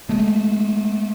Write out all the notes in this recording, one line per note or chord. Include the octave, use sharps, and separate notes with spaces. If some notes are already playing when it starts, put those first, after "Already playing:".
G#3 A3